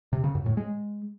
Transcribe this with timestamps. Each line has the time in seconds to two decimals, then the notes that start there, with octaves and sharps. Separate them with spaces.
0.13 C3
0.24 C#3
0.35 F#2
0.46 A2
0.57 G#3